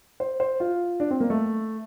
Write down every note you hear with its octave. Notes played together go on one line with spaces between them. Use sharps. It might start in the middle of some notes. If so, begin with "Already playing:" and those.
C5
C5
F4
D4
C4
A#3
A3